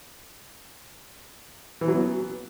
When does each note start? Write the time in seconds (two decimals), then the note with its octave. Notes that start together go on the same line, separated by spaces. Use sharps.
1.81 E3
1.88 F#3
1.95 B3